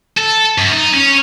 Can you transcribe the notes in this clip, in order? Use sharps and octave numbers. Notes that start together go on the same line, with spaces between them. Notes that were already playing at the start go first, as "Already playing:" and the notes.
A4
F#2
D#4
C#4